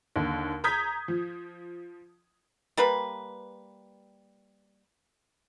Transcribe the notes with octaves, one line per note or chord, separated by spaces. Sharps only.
D#2 D3
A#5 D#6 G6 G#6 B6
F3
G3 A#3 B4